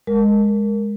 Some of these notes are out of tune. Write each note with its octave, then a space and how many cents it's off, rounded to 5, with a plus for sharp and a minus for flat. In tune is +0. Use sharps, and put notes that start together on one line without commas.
G#3 +0 A#4 +0